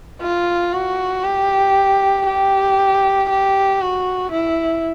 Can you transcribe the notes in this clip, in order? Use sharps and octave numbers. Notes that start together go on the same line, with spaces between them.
F4
F#4
G4
G4
G4
F#4
E4